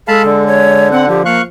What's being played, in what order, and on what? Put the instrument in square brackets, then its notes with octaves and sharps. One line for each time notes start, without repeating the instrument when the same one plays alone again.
[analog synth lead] G#3 [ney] A4 [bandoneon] F5 A5 B5
[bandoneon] D3
[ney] C#5
[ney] C4 [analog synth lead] F#5
[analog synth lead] F3 [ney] G4
[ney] A#3 [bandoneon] F5 C#6 F#6